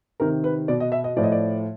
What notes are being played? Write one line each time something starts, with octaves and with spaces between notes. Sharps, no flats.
C3 D#3 A#4
B4
B2 D5
D#5
E5
D#5
A2 F3 D5
D#5
D5